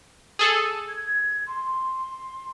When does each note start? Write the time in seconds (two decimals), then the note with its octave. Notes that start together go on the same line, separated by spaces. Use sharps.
0.39 G#4 A4 A5
0.88 G#6
1.47 C6